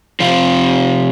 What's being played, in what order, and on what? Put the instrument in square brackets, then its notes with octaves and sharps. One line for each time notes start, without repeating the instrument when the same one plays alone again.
[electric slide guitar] C3 F3 C4 F4